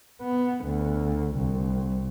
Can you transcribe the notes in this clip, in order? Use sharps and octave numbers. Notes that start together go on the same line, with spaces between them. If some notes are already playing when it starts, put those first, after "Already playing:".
B3
D2
C2